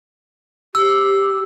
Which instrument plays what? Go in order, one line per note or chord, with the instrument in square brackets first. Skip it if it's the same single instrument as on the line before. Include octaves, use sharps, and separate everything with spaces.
[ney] G4 [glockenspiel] E6